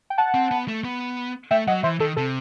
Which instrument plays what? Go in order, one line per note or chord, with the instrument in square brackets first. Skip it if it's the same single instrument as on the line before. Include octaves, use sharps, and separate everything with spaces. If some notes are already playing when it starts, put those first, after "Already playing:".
[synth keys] G5
F#5 A5
[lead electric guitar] C4
B3
A3
B3
[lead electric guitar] A3 [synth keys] E5 G5
[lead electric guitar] F#3 [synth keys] D#5 F#5
[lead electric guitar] E3 [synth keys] C5 E5
[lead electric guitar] D#3 [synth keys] A4
[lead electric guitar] C3 [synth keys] A4